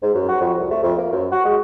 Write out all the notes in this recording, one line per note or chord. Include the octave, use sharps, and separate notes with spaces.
G#2
F#2
F#4
F2
C2
A3
F2
A#3
F#2
F#4
G#3